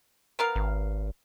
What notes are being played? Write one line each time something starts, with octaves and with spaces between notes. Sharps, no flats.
B3 A#4 F5
G#1